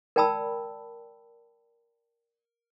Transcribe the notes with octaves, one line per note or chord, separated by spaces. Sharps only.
A#4 D5 G5 A5 B5 E6